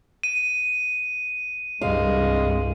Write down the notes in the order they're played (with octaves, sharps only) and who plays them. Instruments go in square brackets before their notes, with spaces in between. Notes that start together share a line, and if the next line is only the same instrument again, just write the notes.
[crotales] D#7
[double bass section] C2 G2 [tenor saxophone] G#3 [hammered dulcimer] F5